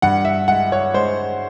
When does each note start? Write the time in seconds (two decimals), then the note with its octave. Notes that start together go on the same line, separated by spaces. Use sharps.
0.02 G2 F#5
0.25 E5
0.48 G#3 F#5
0.72 C#5
0.94 G#3 C5